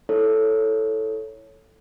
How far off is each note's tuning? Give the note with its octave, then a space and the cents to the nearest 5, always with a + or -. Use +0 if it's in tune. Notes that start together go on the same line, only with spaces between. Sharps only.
E4 -5 A4 +0 C#5 +0